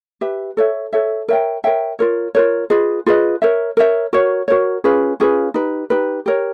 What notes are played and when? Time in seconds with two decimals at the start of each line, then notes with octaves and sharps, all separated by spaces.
0.21 G4 B4 E5
0.57 A4 C#5 E5
0.93 A4 C#5 E5
1.28 A#4 C#5 E5 G5
1.64 A#4 C#5 E5 G5
1.99 F4 A#4 C#5
2.35 F4 A#4 C#5
2.70 F4 G#4 B4 D#5
3.06 F4 G#4 B4 D#5
3.42 A#4 C#5 E5
3.77 A#4 C#5 E5
4.13 F#4 A#4 C#5
4.48 F#4 A#4 C#5
4.84 C#4 F4 G#4 B4
5.20 C#4 F4 G#4 B4
5.54 D#4 G4 B4
5.90 D#4 G4 B4
6.26 G4 A#4 C#5